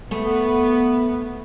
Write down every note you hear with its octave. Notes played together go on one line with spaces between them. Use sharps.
A3 B3